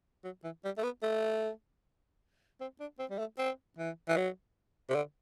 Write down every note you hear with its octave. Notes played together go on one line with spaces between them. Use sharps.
F#3
E3
G3
A3
B3
A3
C4
D4
C4
G3
A3
C4
E3
E3
F#3
C3
D3